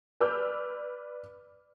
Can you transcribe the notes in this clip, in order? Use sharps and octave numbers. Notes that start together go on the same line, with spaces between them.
B4 D5 D6 E6 F6 G6